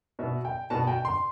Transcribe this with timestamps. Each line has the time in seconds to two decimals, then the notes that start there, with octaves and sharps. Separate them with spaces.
0.19 B2 E5
0.45 G5
0.70 B2 A5
0.87 G5
1.05 C6